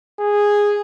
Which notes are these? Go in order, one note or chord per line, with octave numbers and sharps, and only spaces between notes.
G#4